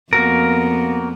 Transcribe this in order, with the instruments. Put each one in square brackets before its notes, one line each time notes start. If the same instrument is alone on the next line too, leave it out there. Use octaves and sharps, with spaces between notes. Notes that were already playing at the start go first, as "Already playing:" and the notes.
[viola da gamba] F2 B3 [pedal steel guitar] A#3 F#4 A#4